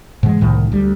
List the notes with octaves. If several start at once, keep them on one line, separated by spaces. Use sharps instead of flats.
G#2 D3 E3 G#3
C2 A2 D#3
D2 G3